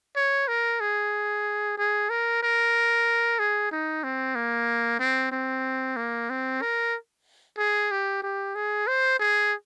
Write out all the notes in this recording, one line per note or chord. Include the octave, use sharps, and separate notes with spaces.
C#5
A#4
G#4
G#4
A#4
A#4
G#4
D#4
C4
A#3
C4
C4
A#3
C4
A#4
G#4
G4
G4
G#4
C5
G#4